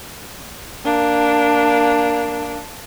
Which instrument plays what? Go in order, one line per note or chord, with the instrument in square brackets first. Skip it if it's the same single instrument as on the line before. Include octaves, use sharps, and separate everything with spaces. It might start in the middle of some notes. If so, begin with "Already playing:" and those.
[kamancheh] A#3 D4